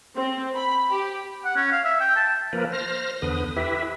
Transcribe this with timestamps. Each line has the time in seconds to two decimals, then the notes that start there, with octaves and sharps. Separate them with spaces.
0.17 C4
0.55 B5
0.91 G4
1.45 F#5
1.56 C#4
1.72 F5
1.84 E5
2.00 G5
2.16 A5
2.53 F3 A#3 A#4 B4
2.72 C5 F6 A#6
3.22 E2 D3 B4 D#6
3.56 E4 G4 B4 E5